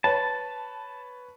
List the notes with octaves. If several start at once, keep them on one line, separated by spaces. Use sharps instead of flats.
B4 C#5 A5